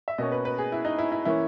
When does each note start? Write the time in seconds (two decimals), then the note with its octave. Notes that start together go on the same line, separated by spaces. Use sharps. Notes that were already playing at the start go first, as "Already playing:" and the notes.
0.08 E5
0.18 B2 A#3 C#4 D#5
0.32 B4
0.45 B4
0.58 G#4
0.72 E4
0.85 D#4
0.99 E4
1.12 E4
1.25 E3 A#3 C#4 E4